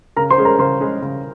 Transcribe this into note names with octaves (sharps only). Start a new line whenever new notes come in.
C#3 A#4 A#5
C5 C6
G#3 C#4 G#4
A#4 A#5
C#3 C5 C6
G#3 C#4 G#4
C#3